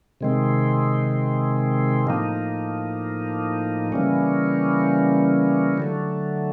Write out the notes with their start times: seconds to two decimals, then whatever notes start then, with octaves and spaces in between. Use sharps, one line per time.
0.21 C3 D#3 G#3 C4
2.07 A2 F3 A#3 D#4
3.92 C#3 E3 G3 A#3 C#4
5.78 D3 F#3 A3